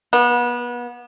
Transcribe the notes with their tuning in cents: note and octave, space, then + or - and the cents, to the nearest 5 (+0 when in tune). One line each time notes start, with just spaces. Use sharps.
B3 -30